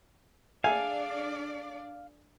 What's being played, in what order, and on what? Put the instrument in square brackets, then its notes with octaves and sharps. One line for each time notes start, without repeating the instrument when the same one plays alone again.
[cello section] D4 D5 [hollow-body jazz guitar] G#4 A4 E5 [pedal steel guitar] F5 [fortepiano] G#5